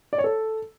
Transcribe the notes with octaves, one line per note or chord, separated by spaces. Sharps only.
D5
C#5
A4